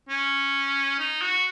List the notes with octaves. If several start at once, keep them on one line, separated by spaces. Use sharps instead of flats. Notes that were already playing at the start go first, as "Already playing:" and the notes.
C#4
D#4
F#4